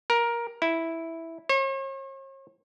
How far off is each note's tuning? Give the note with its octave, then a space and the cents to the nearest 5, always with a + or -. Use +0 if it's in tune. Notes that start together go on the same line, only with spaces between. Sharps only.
A#4 +15
E4 -5
C#5 -45